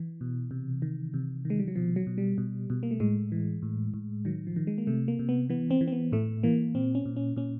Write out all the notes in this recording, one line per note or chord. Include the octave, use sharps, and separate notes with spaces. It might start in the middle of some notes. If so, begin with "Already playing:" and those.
Already playing: E3
B2
C3
D#3
C3
D#3
G#3
G3
F#3
B2 F3
F#3
B2
G3
B2
B2
A#3
A3
A2 G#3
E3
A2
A2
D#3 F#3
F3
D#3
G#3
A#3
C3 A3
A#3
C3
B3
E3 B3
C4
E3
C4
B3
A2 A3
E3 A#3
A#2 C4
C#4
A#2
C#4
A#2 C#4